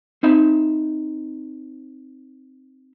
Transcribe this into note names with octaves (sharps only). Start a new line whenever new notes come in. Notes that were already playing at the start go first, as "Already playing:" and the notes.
C4 D#4 E5 B5